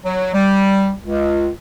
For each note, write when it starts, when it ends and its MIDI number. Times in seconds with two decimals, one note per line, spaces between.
0.05 0.30 54
0.34 0.92 55
1.04 1.49 37